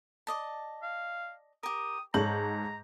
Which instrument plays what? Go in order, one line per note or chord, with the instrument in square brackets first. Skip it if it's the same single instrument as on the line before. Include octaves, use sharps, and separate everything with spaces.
[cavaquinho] D5 D#5 A5
[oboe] F5
[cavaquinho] G4 A#4 [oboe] D#6
[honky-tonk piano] G#2 G6 F#7 [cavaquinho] A4 C#5 [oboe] A#5